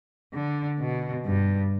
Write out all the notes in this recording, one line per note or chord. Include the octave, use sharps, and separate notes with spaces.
D3
B2
G2